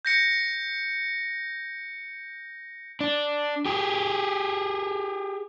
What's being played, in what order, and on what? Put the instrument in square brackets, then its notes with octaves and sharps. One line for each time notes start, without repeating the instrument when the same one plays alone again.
[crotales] G6 A#6 C#7
[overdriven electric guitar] D4
G4 G#4